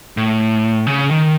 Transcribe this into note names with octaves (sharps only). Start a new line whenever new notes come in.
A2
C#3
D#3